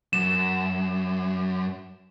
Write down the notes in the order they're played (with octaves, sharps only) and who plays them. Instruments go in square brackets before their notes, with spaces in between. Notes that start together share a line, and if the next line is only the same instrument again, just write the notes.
[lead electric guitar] F#2 [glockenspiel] E7